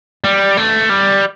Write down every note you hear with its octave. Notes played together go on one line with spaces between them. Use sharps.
G3
A3
G3